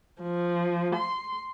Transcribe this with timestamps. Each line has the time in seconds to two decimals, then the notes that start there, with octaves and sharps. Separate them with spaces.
0.21 F3
0.95 C6